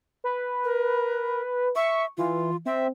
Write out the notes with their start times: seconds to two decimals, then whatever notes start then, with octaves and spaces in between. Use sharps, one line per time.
0.24 B4
0.65 A#4
1.76 E5 C#6
2.18 E3 F4
2.66 C4 E5